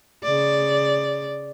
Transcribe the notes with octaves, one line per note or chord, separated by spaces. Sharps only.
C#3 D5